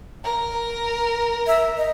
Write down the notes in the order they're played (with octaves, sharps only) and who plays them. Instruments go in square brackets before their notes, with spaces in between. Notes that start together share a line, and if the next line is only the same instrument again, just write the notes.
[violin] A#4 [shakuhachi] A#5
[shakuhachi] E5
D#5